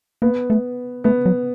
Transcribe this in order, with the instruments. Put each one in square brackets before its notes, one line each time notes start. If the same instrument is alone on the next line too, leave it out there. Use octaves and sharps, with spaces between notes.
[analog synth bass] A#3 [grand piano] B3
[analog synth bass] A3
[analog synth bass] A3 [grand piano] B3
[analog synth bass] F#3